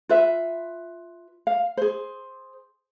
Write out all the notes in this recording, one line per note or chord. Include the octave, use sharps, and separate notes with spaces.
F4 B4 E5
F5
G#4 C5